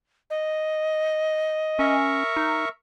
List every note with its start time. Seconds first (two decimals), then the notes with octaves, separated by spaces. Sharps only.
0.30 D#5
1.79 C#4 A#4 E5 C#6
2.37 D#4